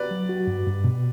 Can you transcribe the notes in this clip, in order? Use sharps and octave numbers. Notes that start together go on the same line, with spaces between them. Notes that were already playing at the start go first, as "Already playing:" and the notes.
Already playing: B4 D5
F#3
F#4
G2
G2
B2